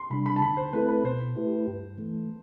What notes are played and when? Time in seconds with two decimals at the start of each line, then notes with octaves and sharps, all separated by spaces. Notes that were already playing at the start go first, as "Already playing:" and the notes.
Already playing: C6
0.10 C3 G3 D4 B5
0.26 B5
0.36 A5
0.41 D3 B5
0.57 C5
0.73 A3 C4 E4 A4 B4
0.89 B4
1.04 B2 C5
1.35 A3 E4 G4 B4
1.67 G2
1.98 E3 A3